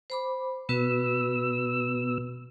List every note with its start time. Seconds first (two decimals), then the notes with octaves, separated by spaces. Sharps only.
0.10 C5 B5 D6
0.69 B2 B3 F#4 B4 E6